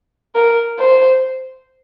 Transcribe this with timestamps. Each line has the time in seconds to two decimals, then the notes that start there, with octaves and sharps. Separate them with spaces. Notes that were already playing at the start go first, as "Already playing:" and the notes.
0.35 A#4
0.79 C5